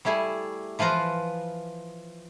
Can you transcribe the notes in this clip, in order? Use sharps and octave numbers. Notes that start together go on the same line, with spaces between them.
G3 A3 E4 G#4
E3 F3 F4 B4 A#5